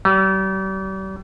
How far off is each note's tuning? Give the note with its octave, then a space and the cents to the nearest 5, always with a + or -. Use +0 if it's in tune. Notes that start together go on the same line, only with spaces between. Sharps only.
G3 -40